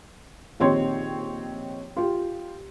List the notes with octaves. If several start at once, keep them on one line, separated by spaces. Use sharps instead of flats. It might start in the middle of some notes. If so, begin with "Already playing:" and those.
A#1 D#3 C4 G4 C#5 C6
F4 G4